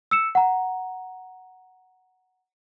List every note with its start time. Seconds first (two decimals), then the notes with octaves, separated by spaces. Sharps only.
0.11 E6 C#7 E7
0.35 F#5 A#5